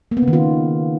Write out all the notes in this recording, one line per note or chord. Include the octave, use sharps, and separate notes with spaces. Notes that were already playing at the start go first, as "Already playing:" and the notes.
A#3
B3
C#3
D#3
F4